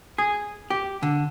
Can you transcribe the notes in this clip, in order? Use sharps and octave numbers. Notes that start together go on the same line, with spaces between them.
G#4
G4
D3